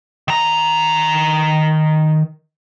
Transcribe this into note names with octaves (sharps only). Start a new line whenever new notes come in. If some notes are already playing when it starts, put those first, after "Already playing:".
D#3 A#5